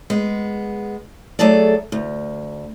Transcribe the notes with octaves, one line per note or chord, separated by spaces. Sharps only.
G#3 B3
F#3 A3 G#4 A4 D5
D2